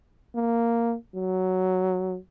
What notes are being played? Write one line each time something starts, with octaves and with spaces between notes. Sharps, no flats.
A#3
F#3